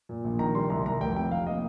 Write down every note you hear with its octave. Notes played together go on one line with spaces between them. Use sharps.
A#2
A#1
D#3 A#5
G3 C6
C2 A#5
C2 A#5
F1 G5
C3 G5
F1 F5
A#3 D#5